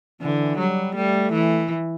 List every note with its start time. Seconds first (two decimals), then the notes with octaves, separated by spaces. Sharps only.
0.21 D3 E3
0.58 F#3 G3
0.95 G3 A3
1.32 E3